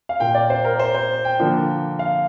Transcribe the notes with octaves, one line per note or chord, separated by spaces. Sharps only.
F5
A#2 A#3 G5
D5
C5
A#4
C5
C5
G5
D3 F3 A#3
F5